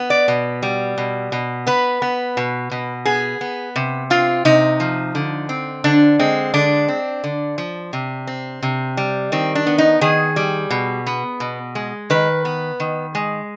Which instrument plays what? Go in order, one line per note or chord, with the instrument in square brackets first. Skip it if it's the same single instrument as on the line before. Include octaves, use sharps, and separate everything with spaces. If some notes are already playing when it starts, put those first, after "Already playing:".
Already playing: [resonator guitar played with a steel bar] B3
D5
B2
G3
B2
B2
B3 B4
B3
B2
B2
B3 G#4
B3
C3
C4 F4
C3 D#4
F3
D3
C4
D3 D4
G#3 C4
D3 D4
C4
D3
F3
C3
C4
C3
G3
D#3 C4
D4
B3
D#4
D#3 G#4
G3
B2
B3
B2
G#3
D#3 B4
B3
D#3
G#3